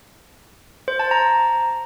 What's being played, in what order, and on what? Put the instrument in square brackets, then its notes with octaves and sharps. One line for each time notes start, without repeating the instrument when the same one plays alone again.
[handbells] C5
A5
A#5